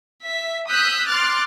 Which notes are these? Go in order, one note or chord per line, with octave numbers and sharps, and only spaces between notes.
E5 B6
D#6 E6 F#6 G6 B6
C6 D6 F6 F#6 A6